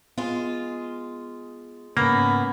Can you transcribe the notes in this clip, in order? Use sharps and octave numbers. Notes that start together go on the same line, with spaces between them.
G#3 B3 F4
G#2 C#3 A#3 B3 C#4 B5